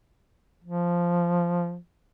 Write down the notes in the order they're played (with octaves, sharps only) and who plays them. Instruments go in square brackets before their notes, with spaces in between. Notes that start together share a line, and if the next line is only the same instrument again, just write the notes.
[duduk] F3